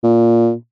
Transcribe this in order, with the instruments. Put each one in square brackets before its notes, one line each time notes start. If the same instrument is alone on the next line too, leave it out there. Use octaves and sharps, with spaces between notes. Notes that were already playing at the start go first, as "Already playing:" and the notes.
[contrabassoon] A#2